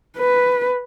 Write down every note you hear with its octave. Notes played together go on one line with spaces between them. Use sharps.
B4